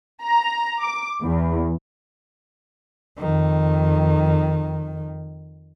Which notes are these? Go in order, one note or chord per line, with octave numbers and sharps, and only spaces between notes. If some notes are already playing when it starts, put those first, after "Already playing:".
A#5
D6
E2
F2 D#3